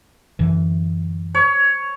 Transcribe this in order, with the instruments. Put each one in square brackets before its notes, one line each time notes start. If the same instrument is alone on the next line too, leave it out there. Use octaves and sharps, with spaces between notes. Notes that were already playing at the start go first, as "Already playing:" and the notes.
[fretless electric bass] F#2 D3 E3
[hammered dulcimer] C#5